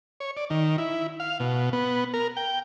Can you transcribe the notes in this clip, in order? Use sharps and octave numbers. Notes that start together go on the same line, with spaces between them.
C#5
D5
D#3
E4
F5
B2
B3
A#4
G5